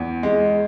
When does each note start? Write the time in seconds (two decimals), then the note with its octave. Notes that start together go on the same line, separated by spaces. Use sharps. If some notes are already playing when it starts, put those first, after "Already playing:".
Already playing: E2
0.23 G#3